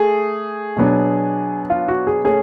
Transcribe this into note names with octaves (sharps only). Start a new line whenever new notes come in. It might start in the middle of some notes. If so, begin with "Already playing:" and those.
Already playing: A3 G#4
B2 F#3 B3 D4
F4
F#4
G#4
A3 C#4 G#4